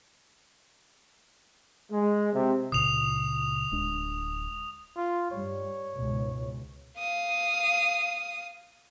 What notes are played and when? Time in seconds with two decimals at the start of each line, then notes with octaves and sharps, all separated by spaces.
1.91 G#3
2.34 C3
2.72 C#2 A#2 C#3 D#6 F7
3.71 D1 G#3 D4
4.97 F4
5.32 G2 G3 C#5
5.94 C#2 G#2 B2
6.98 F5 D#6